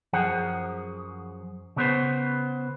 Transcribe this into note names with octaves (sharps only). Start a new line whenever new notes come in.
F#2 F3 G#4 F#5
C#3 B3 C5